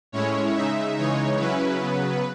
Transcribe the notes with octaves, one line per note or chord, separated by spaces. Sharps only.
A2 G#3 C#4 E4 C#5
C#3 G#3 D#4 E5
C#3 E3 G#3 D#4 C#5
C#3 F#3 C#4 E4 B4
C#3 F#3 B3